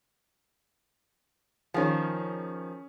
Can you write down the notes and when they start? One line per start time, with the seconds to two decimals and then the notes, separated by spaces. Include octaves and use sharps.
1.74 D#3 F3 C#4 G#4